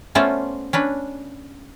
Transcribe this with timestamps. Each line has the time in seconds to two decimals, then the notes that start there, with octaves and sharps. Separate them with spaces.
0.15 A3 B3 C#4 F4 C5 D5
0.73 C#4 D4 B4